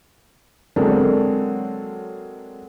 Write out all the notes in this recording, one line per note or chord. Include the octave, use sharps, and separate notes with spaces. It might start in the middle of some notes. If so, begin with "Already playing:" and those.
F#3 G#3 A#3 C4 D4 A4